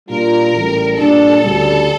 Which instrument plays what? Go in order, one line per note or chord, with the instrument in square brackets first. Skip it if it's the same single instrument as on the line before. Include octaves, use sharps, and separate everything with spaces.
[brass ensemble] A#2 G3 D4 F4 [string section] A#4
[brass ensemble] A1 A2 G3
[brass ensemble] A#2 G3 D4 [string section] A4
[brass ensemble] D2 C#3 G3